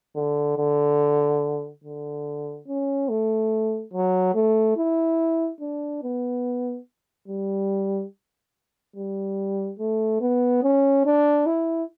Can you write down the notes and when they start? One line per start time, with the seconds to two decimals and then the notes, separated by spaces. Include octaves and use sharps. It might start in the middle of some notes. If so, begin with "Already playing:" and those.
0.16 D3
0.57 D3
1.84 D3
2.68 C#4
3.09 A3
3.93 F#3
4.34 A3
4.77 E4
5.60 D4
6.03 B3
7.28 G3
8.96 G3
9.79 A3
10.21 B3
10.63 C#4
11.06 D4
11.46 E4